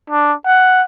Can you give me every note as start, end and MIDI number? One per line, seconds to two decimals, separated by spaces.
0.10 0.34 62
0.46 0.83 78